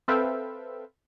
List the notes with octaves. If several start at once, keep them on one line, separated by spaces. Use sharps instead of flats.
C4 A4 B4 E5 F5 G5